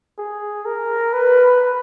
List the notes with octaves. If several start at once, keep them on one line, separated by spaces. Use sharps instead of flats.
G#4
A#4
B4